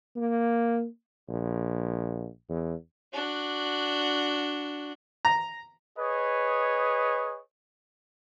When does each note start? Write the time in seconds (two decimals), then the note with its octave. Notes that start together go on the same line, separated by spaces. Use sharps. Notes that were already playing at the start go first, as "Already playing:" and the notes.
0.16 A#3
1.29 A#1
2.49 E2
3.14 D4 F#4
5.25 A#5
5.98 G#4 B4 C#5 D#5